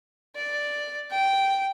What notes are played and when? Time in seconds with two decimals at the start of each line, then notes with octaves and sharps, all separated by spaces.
0.36 D5
1.11 G5